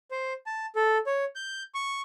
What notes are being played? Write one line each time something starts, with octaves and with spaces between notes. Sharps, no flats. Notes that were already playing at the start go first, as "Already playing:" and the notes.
C5
A5
A4
C#5
G6
C#6